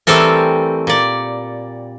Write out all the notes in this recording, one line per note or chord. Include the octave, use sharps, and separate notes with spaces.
E3 G3 A3 C4 A4 A#4
A#2 D5